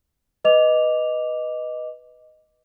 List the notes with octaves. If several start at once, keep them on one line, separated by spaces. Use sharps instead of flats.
B4 D#5 D6 F7